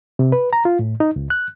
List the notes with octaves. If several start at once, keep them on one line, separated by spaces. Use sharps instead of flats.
C3
B4
A#5
F4
A2
D#4
C#2
F#6